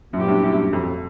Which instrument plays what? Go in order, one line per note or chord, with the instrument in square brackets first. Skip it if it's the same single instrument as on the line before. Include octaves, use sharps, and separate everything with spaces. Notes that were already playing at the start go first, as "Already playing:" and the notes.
[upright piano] F#2 [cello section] A#2 F#3 B3 E4 G4
[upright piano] G2
F#2
G2
F2
F2